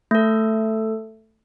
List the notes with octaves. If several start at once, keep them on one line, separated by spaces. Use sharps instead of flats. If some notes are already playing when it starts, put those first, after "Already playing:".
A3 A4